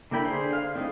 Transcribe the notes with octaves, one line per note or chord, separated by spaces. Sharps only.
D3 A#3 E4 G5 B5
D3 G#4 C5
F5
D3 E3 A3 C4 D#4